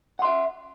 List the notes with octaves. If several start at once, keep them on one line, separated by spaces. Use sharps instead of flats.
E5 F#5 C6